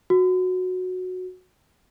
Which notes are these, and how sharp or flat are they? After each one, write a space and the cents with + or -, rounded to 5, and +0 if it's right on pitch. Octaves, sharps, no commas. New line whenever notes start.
F#4 -10